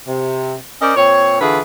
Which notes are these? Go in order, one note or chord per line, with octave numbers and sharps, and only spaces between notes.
C3
C#4 A#4 C5 D5 D#5
A#2 C4 C#5
D3 E3 F4 G#4 B4